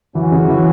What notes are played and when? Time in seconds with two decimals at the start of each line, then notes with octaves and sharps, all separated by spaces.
0.15 F#2 E3 F#3 C#4 F#4
0.32 C#3
0.48 E3